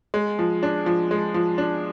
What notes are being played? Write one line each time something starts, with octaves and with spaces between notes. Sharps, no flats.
G#3
F3
D4
F3
G#3
F3
D4